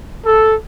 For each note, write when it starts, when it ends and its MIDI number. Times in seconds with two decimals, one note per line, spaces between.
0.24 0.54 69